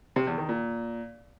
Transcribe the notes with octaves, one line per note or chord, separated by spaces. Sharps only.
C3
E2
D#3
A#2